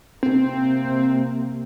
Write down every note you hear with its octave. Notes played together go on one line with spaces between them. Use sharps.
C3 A#3 C4